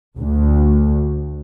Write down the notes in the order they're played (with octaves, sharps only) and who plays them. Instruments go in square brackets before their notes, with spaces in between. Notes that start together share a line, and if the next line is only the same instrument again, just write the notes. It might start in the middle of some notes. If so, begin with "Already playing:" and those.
[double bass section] D2